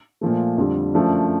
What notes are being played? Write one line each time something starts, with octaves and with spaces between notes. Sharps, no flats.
A#2 F3 A3
F2 D3 G3
F#2 D3 F3 A3 D4